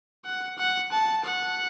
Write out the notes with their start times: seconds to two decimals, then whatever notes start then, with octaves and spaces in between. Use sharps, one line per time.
0.25 F#5
0.58 F#5
0.92 A5
1.25 F#5